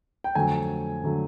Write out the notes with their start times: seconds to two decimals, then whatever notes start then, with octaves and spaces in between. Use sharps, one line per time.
0.24 G5
0.35 F2 D3 F#3 A3 G#5
1.04 D3 F#3 A3